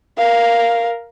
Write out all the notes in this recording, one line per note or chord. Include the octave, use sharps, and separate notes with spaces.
A#4 F5